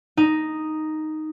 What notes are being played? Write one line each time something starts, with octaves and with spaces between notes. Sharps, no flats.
D#4